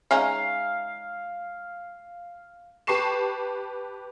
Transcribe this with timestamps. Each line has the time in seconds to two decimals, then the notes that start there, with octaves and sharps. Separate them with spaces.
0.11 G#3 C#4 D#4 E5 F5 G#5 A#5
2.87 G4 B4 A5 C#6 C7 E7